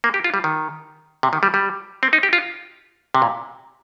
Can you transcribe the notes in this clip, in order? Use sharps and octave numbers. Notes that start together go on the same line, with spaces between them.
A#3
G4
F4
G3
D#3
C3
D#3
G3
G3
C4
D#4
G4
F4
C3
A#2